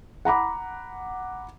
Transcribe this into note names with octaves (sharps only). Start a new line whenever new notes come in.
F#5 A#5 B5 D6